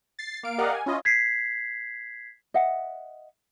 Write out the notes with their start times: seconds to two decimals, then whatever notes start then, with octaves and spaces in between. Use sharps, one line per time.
0.19 A6 C7
0.43 A#3 F5 D7
0.58 G4 A#4 D5 D#5 F5 F#5
0.74 G#5
0.86 C#4 E4 F4 D#5
1.05 G#6 B6 C7
2.54 D#5 E5 F#5